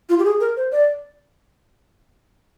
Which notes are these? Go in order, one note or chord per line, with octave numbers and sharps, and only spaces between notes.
F4
G4
G#4
A#4
C5
D5